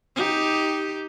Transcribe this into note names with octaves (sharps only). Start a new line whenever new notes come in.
D#4 G4